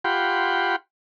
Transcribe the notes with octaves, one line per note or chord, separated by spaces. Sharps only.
F4 G4 F#5 G5 B5 C6